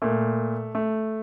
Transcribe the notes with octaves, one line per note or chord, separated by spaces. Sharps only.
A#2 A3
A3